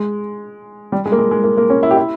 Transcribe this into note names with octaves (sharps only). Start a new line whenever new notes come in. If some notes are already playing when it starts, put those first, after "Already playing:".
Already playing: G#3
G3
G#3
A#3
G#3
G#3
A#3
A#3
C#4
E4
G4
E4